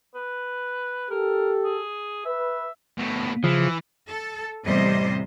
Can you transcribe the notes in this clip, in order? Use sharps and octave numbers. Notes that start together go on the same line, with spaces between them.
B4
G4 A4 A#4
G#4
B4 E5
B2 A3
C#3 E3 F3
A4
E2 A2 C3 G3 C5 D#5